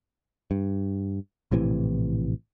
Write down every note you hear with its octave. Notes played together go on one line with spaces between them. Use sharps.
G2
A#1 A2 C3 E3